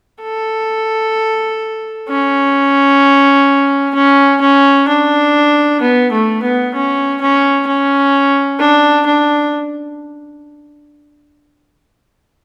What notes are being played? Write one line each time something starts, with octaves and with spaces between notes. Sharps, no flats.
A4
C#4
C#4
C#4
D4
B3
A3
B3
C#4
C#4
C#4
D4
D4